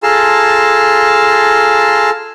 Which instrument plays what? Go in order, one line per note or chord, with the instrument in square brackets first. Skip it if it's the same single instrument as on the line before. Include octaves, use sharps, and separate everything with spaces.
[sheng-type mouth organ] F4 G#4 A4 A5 A#5 C6